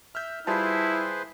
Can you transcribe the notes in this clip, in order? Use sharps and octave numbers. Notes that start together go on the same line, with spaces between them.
E5 F6 G6
G3 E4 F4 G#4 B4 C5 A5